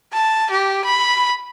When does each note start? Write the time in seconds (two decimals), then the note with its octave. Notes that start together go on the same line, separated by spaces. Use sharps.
0.13 A5
0.51 G4
0.85 B5